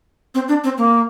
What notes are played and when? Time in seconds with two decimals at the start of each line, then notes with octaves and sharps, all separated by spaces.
0.35 C4
0.48 D4
0.64 C4
0.78 A#3